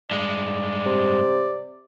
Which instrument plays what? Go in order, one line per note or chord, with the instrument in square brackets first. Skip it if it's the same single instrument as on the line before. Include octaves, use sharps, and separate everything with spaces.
[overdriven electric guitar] G2 G#3 [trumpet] D5
[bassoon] C3